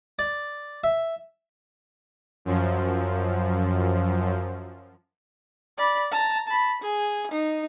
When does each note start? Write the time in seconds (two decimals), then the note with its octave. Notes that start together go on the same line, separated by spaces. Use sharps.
0.19 D5
0.84 E5
2.45 F#2 F3
5.77 D5 B5
6.11 A5 A#5
6.48 A5 B5
6.82 G#4
7.31 D#4